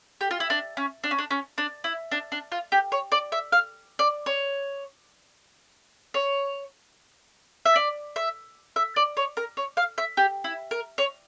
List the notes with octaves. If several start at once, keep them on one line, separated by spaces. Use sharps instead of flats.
G4
F4
E4
D4
C#4
D4
C#4
D4
C#4
D4
E4
D4
D4
F4
G4
C#5
D5
E5
F5
D5
C#5
C#5
E5
D5
E5
E5
D5
C#5
A#4
C#5
F5
E5
G4
E4
A#4
C#5